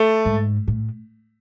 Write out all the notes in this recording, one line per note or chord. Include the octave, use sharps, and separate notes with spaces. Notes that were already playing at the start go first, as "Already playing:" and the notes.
Already playing: A3
G#2
A2